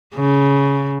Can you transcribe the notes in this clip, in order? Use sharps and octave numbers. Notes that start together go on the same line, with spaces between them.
C#3